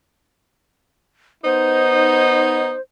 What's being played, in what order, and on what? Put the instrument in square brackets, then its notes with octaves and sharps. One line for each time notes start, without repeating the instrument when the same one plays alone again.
[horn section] B3 D#4 [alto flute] C5